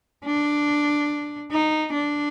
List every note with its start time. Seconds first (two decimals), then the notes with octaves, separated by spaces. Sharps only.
0.25 D4
1.51 D#4
1.93 D4